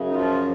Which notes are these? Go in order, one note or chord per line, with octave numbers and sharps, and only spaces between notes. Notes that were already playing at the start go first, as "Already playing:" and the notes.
Already playing: F#2 C#3
D#4
F3 F4